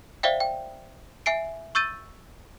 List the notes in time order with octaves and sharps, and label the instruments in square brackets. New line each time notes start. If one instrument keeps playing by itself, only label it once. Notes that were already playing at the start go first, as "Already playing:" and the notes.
[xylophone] C5 D5 E5 F5 G5
G5
E5 G#5 C7 D7
C#6 E6 G6 A6 D#7